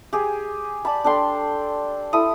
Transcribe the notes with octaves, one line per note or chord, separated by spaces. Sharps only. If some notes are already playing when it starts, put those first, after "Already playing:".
G4 G#4 G#5
D5 A5 B5
D4 A4 G5 C6
E4 A4 D#6